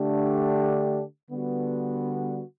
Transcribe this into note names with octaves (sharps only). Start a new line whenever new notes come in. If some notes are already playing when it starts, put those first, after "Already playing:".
Already playing: D3 A3 D4 G4
D3 G3 B3 F#4